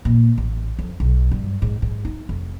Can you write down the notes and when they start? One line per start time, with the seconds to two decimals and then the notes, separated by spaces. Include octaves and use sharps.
0.05 A#2
0.38 A1
0.79 F2
1.00 B1
1.32 G2
1.62 G#2
1.82 G#2
2.05 D#4
2.29 F1